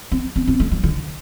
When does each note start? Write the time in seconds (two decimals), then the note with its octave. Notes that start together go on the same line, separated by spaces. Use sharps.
0.12 C4
0.36 C4
0.47 C4
0.60 A3
0.72 G3
0.84 D3